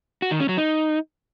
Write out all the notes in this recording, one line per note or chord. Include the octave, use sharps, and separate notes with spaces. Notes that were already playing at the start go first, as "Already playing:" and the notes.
F#4
D#3
C#4
F#3
D#4